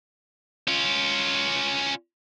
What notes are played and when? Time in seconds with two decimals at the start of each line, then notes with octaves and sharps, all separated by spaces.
0.68 C#4 F4